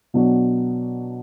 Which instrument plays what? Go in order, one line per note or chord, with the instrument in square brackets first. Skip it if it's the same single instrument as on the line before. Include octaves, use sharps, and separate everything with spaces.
[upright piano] B2 F#3 B3 D4 F#4